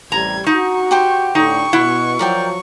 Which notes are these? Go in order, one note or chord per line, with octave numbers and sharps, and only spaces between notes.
A1 C3 G3 A#5 G#6
D#4 F#4 C#6
G4 C5 G5
A2 D3 D#4 C#6
B2 E4 F#5
F3 F#3 A#4 D5 G5